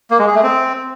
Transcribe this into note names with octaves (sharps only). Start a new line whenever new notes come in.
A#3
G#3
G#4
A3
C4